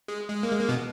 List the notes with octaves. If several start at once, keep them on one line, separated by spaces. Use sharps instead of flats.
G#3
G#3
A#3
G#3
A#3
B2 B3